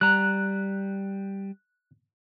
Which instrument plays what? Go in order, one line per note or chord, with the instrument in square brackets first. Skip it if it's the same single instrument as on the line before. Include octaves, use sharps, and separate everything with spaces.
[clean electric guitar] G3 A#5 [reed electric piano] F#6